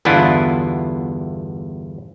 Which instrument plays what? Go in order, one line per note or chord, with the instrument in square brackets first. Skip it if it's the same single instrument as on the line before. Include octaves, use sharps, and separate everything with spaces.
[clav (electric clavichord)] G1 E2 B3 D4 E4 F4